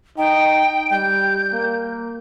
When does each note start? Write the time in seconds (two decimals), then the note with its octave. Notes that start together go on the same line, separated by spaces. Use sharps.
0.18 D#4 G5
0.91 G3 G6
1.53 A#3